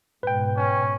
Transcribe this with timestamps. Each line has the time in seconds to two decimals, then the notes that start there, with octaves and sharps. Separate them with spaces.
0.23 G#2 B2 B4 G5
0.57 C#4